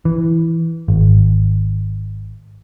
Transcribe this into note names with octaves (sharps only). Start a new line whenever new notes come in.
E3
G#1